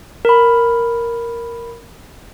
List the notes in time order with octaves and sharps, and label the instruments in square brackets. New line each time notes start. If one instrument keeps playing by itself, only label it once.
[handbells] A#4 B5